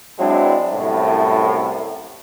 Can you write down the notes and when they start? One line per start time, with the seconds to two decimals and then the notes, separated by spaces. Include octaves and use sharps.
0.19 F#3 G#3 C4 D4 E4
0.72 C2 F#2 A2